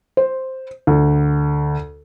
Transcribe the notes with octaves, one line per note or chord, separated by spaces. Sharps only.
C5
D2